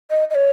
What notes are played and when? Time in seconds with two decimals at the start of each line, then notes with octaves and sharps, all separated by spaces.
0.10 D#5
0.30 D#5
0.35 C#5